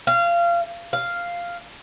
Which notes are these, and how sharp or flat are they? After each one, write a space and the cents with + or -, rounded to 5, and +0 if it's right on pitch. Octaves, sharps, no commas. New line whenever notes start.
F5 -25
F5 -5